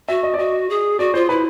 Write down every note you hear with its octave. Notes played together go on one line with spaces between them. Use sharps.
F#4 E5
D#5
D5
F#4 D#5
G#4
F#4 D5
F4 C5
E4 B4